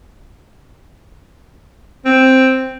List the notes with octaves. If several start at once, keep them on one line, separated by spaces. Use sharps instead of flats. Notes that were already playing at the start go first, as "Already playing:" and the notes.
C4